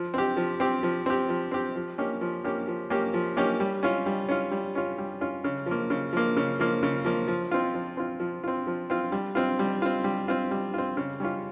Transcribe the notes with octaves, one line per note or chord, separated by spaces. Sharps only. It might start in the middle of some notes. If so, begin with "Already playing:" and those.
Already playing: F3
C4 G4
F3
C4 G4
F3
C4 G4
F3
C4 G4
F3
A#3 C#4 G4
F3
A#3 C#4 G4
F3
A#3 C#4 G4
F3
A#3 C#4 G4
G3
C#4 F4
G3
C#4 F4
G3
C#4 F4
G3
C#4 F4
C#3
F3 A#3
C#3
F3 A#3
C#3
F3 A#3
C#3
F3 A#3
F3
C4 F4
F3
C4 F4
F3
C4 F4
F3
C4 F4
G3
C4 F4
G3
C4 F4
G3
C4 F4
G3
C4 F4
C#3
G3 C#4 F4